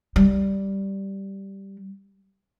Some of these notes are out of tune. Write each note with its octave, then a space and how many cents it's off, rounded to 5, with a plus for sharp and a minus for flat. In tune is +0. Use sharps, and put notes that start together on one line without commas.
G3 -5